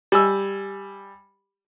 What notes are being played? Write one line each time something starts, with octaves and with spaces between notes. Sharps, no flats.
G3 G#5 E6